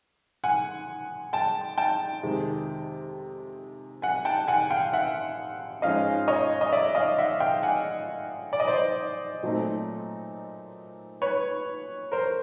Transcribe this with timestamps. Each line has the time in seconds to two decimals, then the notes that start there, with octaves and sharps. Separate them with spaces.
0.44 F#5 G#5
1.33 G5 A5
1.78 G5 A5
2.23 F2 C3 D#3 G#3
4.02 F#5 G#5
4.25 G5 A5
4.48 F#5 G#5
4.70 F5 G5
4.93 E5 F#5
5.82 G#2 F3 G#3 C#4 D#5 F5
6.28 C#5 D#5
6.61 D#5
6.72 D5 E5
6.95 D#5 F5
7.18 E5 F#5
7.40 F5 G5
7.63 F#5 G#5
8.53 D5
8.60 D#5
8.67 C5 D5
9.43 A#2 F#3 A3 C4 D#4
11.22 B4 C#5
12.12 A#4 C5